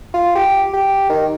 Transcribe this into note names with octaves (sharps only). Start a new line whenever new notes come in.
F4
G4
G4
D#3